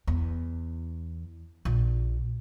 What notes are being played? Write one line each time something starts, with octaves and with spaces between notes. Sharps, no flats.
E2
A#1